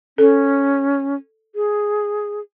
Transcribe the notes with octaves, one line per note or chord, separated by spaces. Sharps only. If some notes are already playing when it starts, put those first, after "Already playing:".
C#4 A4
G#4